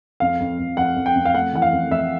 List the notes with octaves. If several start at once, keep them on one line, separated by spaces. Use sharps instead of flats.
F2 F5
F2
F2
F2 F#5
F2
G5
F2
F5
A3 F#5
E3 F#5
F5
F2
F2 E5